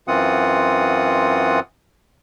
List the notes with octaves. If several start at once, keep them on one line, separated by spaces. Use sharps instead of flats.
F#2 E3 C4 F4 F#5 D#6